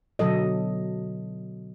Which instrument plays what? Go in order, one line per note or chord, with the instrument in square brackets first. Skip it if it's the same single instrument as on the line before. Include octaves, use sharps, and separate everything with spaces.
[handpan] B2 D3 F#3 A4 D#5